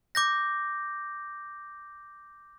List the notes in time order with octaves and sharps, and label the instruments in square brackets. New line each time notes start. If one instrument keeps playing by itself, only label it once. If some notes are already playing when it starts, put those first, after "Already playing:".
[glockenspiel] D6 G6 A#6